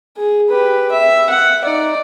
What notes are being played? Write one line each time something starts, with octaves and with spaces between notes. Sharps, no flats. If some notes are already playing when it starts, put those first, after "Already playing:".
G#4
G4 B4
E5
F#5
D#4 D5